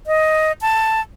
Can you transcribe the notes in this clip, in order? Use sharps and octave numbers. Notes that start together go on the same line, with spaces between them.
D#5
A5